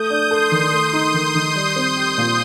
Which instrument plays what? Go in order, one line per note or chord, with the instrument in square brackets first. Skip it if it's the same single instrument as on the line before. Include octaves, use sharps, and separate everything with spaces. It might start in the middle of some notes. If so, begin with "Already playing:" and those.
Already playing: [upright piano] A3 [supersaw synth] D#6 G6
[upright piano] D4
[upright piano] A4 [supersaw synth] C6 D#6
[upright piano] D#3
[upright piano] A3 [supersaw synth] C6 D#6
[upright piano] D#4
D#3
D#3
G3
C4
G4
A#2